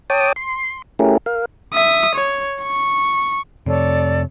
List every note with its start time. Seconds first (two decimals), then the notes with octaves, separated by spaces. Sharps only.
0.10 C#5 G5 A5 D6 D#6
0.36 C6
0.99 A3 C#4 E4 G4 G#4 A#4
1.26 A#4 F5
1.74 E5 D#6
2.15 C#5
2.62 C#6
3.66 F2 C3 A4 C#5 D5